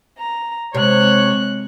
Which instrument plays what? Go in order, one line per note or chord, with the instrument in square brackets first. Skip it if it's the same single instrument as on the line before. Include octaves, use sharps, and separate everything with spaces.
[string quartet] A#5
[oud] C3 [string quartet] G#3 F#6 [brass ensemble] C#5